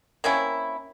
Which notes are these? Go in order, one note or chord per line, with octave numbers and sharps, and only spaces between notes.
A#3 C4 C#4 E4